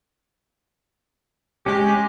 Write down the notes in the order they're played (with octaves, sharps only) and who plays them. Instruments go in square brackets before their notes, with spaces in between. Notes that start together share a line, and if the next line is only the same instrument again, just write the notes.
[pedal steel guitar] G#3 C#4 [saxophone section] G4